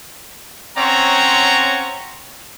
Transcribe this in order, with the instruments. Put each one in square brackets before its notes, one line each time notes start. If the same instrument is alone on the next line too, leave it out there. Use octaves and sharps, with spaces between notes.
[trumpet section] C4 C#4 C#5 F#5 A#5